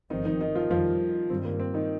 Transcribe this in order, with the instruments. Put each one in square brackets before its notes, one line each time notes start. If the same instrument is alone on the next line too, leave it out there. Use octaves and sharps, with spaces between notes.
[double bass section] G1 G2 F3 C4 [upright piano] D#3 D#4
[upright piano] D#3 D#4
D#3 D#4
F3 F4
[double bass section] F2 D#3 G3 [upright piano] F3 F4
[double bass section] G2 D#3 G3 [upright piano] C4
[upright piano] A#3
C4
D#3 D#4